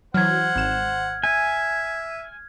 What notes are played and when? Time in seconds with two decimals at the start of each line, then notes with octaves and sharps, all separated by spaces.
0.14 E3 F#3 C5 F#5 F6 G#6
0.56 G#1 E7
1.24 E5 G#5